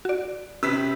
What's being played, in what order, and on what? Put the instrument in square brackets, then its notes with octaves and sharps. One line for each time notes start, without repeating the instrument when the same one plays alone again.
[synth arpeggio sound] F#4 D5
[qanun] C3 B4 [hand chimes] C#4 [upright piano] E6 B6